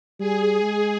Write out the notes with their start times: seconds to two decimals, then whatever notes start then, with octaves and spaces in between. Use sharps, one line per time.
0.19 G3 G#4
0.61 G#3